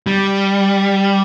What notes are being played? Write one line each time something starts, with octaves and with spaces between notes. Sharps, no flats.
G3